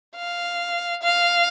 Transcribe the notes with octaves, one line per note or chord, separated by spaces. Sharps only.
F5
F5